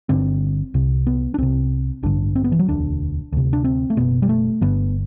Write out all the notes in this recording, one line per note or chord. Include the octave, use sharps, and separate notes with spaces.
G1 G2 D3 C4
C2 C3
B3
D4
C2 C3 C4
A1 G2 D3 D4
C4
B3
E3
F#3
E1 D2 D3 D4
D2 C3
D4
C4
A3
F#1 E2 B2 B3
G3
A3
G1 G2 D3 B3